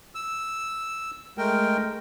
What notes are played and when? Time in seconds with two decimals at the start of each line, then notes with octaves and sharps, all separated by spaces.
0.15 E6
1.38 G#3 A3 A#4 G5